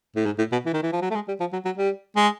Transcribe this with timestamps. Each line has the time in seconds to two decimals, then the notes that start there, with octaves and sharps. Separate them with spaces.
0.16 A2
0.26 G#2
0.38 A2
0.52 B2
0.66 E3
0.74 D#3
0.83 E3
0.92 F3
1.02 F#3
1.10 A3
1.15 G#3
1.28 G3
1.40 F3
1.53 F#3
1.65 F#3
1.78 G3
2.16 G#3